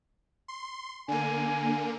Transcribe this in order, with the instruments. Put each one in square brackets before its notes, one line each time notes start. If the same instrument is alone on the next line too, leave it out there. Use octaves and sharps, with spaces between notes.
[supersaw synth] C6
[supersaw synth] D3 A#3 [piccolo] G#5